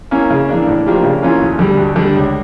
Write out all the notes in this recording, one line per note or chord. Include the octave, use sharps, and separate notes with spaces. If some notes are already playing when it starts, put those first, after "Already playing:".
A#3 C#4 E4
C#3
E3 A#3 D4
A2
F3 A#3 D4 G4
C#3
E3 A#3 C#4 F4
D2
D3 G3
D2
D3 G3 D4
C#2